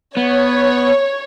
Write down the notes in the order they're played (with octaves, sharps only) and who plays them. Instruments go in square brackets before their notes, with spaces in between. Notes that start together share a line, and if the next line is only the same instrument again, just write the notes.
[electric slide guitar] B3 [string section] C#5